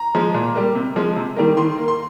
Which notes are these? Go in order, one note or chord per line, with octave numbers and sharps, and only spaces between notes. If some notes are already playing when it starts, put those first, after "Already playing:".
Already playing: A#5
F3 G#3
A#2
G3 A#3
C3
F3 G#3
C3
D#3 G3 A#3
D#3 C6
A#3
C6